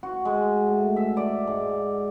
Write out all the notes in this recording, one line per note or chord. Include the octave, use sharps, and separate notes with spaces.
F#4
G#3
A2
E5
D5
G#2